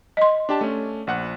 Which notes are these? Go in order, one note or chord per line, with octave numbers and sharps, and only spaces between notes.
D#5 C6
D4 G4 A5
A3 C#4
A#1 F#5 F#6